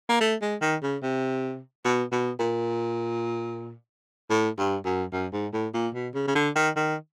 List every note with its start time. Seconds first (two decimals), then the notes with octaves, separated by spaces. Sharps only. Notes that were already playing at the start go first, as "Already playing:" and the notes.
0.09 A#3
0.21 A3
0.42 G#3
0.61 D#3
0.83 C#3
1.03 C3
1.85 B2
2.12 B2
2.40 A#2
4.30 A2
4.58 G2
4.85 F#2
5.13 F#2
5.33 G#2
5.53 A2
5.74 A#2
5.94 B2
6.14 C#3
6.28 C#3
6.35 D3
6.55 D#3
6.76 D#3